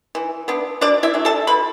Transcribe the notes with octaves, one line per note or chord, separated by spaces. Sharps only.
E3
B3 D4
B2 D4 D5
E4 E5
F#3 A3 D4
A4 A5
B2 B4 B5